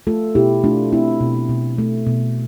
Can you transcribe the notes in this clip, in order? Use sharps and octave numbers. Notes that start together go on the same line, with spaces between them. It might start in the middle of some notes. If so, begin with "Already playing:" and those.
A3 F4 A4
B2 E4 G4
A3 D4 F4
A3 C4 E4
B2
B2
A3
B2